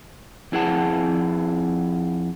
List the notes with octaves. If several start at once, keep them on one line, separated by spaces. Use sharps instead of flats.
F2 E4 G#4 F#5 A5